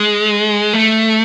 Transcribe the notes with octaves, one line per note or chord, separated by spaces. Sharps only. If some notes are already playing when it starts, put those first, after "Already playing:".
Already playing: G#3
A3